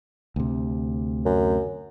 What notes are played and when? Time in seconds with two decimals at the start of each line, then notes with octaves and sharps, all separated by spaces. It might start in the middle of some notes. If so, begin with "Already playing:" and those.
0.36 D2 C3
1.26 F#2